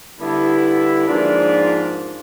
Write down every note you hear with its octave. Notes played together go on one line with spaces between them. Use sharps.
D3 G3 B3 E4
G#2 F3 A#3 D4 F4